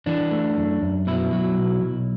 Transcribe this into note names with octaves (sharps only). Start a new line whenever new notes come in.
E3 D4
A3
F#2
F#2
B2 E4
F#3
B1
B1